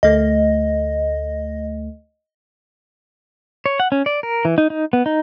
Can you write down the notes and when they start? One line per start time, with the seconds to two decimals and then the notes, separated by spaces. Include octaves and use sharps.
0.03 D2 A3 D#5
3.66 C#5
3.80 F#5
3.92 C#4
4.06 D5
4.23 A#4
4.45 E3
4.58 D#4
4.70 D#4
4.93 B3
5.06 D#4